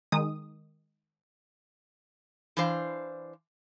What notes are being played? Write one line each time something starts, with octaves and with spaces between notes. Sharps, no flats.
D#3 G#3 D#6
E3 D4 C5 F5